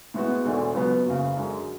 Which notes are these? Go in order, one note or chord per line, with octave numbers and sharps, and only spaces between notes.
A2 G#3 B3 F#4
E1 D2 D3 A3 D4
C#2 B2 F#3 B3
F#1 F#2 C#3
F#2 D3 G#3